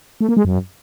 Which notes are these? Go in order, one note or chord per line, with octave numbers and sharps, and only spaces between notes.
A3
A#3
G#3
F#2